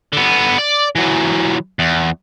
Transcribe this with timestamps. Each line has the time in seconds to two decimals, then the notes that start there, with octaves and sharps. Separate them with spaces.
0.13 D3 B3
0.58 D5
0.95 E3 F#3
1.79 E2